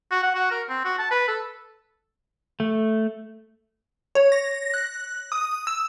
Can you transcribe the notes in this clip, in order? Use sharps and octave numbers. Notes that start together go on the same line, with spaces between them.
F#4
F#5
F#4
A#4
C4
F#4
A5
B4
A4
A3
C#5
A#6
F#6
D#6
E6